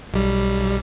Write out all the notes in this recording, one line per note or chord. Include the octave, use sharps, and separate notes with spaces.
B1 G3